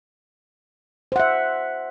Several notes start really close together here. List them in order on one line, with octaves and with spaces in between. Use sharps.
C5 F#5 E5